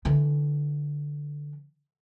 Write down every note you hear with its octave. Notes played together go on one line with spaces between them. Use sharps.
D3 E3